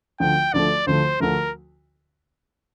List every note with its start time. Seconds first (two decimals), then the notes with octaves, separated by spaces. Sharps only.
0.20 D2 D3 F3 A3 G5
0.53 D2 D3 F3 A3 D5
0.87 D2 D3 F3 A3 C5
1.20 D2 D3 F3 A3 A#4